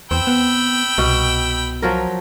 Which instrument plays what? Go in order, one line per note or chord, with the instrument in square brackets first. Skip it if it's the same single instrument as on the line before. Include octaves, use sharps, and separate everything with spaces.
[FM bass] E2 [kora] C4 [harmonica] G5 B5 E6
[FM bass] B3
[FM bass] C2 [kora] B2
[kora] F3 F#3 A#4